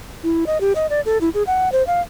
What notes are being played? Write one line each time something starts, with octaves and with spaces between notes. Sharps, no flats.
E4
D#5
G4
D#5
D5
A4
E4
G#4
F#5
C5
F5